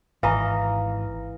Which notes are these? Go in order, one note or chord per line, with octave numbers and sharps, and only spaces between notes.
G#1 E3 D#5 F5 A#5